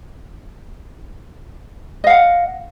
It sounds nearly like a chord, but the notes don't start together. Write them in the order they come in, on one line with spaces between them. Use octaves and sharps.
D#5 F5 F#5